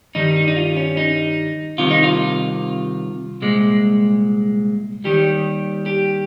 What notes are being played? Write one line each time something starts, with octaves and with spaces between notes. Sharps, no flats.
G2 D#3 G3 D#4
D#4
D#4
F4
C#4
D#4
C2 C3 D#3 F4
D#4
F4
C2 A#2 G#3
D#2 D#3 G3 G4
G4